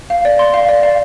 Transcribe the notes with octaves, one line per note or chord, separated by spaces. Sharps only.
F5
D5
C6
F5
D5
F5